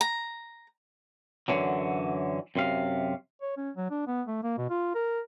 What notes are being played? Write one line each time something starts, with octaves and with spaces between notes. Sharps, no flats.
A#5
F#2 A2 D3 E3 F#3
F#2 C3 F5
C#5
C#4
F#3
D4
B3
A3
A#3
B2
F4
A#4